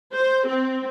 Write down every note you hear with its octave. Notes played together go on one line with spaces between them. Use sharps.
C5
C4